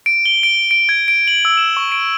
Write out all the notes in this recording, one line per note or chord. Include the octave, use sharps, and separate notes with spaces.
D7
G7
D7
D7
G#6
D7
F#7
E6
E7
C#6
D7